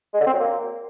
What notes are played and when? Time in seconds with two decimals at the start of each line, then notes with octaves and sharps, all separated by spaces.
0.14 G#3
0.20 D3
0.27 C4
0.33 F#3
0.39 A#3